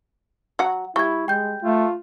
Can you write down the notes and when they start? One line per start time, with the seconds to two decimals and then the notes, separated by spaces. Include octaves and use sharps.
0.59 F#3 F#4 F#5
0.96 G3 E4 C#6 G#6
1.28 G#3 G5 G6
1.63 A3 F4